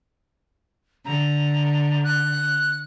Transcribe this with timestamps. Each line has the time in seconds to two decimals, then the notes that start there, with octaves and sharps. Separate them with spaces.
1.05 D3 A#5
2.04 F#6